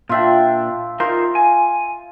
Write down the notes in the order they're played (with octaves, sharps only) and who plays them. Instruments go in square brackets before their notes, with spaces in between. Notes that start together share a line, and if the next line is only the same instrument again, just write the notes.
[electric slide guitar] A#2 D4 [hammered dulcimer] F4 E5 G5
[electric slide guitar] D#4 A#4 C5 [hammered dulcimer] F4
[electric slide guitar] G#5